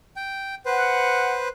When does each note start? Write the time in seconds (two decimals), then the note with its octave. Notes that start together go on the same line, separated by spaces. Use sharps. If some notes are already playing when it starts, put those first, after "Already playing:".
0.16 G5
0.66 B4 C5 F#5